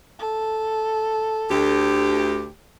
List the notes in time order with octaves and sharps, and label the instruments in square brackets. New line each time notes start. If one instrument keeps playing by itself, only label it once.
[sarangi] A4
[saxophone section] D2 G4